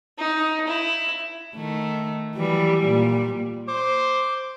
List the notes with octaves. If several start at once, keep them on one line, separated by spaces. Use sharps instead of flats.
D#4
E4
D#3 A3
E3 F#3 G3
A#2 G3
C5 D6